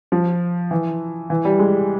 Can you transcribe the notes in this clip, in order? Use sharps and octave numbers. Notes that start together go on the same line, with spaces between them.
F3
E3
E3
G3
G#3